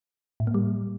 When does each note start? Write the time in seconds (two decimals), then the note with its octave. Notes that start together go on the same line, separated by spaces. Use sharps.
0.40 A2
0.47 A#3
0.54 G3